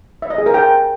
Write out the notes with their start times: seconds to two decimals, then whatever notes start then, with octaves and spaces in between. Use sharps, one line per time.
0.22 E5
0.30 D#5
0.38 G#4
0.46 A#4
0.54 G5